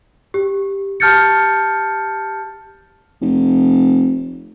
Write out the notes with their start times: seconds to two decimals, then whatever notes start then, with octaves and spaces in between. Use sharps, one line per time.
0.34 G4
1.00 G4 A5 F6 G6 A6 C#7
3.21 F1